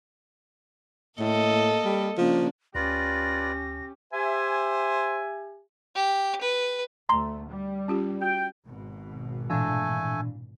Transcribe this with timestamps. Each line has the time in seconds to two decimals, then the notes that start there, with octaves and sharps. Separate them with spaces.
1.19 A2 A#3 A4 D#5
1.84 G3
2.17 C#3 F3 A#3 D4
2.75 D2 C#4 F4 G4 B4 D5 A#6
4.13 G4 C5 E5 G#5
5.95 G4
6.41 B4
7.09 D2 A3 A#5 C6
7.50 G3
7.88 C#4 F4 G4
8.21 F#4 G5
8.67 G#1 B2
9.50 A#2 E3 A3 D4 A4 G#5